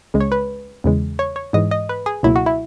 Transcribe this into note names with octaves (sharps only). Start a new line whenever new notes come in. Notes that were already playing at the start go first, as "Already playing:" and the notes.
C#2 C#3 G#3
C#5
B4
E2 C#3 E3 G#3
C#5
C#5
G#2 E3 G#3 D#5
D#5
B4
G#4
C#2 B2 F#3 A#3 E4
F#4
E4